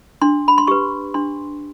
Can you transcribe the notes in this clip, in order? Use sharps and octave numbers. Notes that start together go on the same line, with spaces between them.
D4 C6
B5
C6
G4 B4 C#6
D4 C6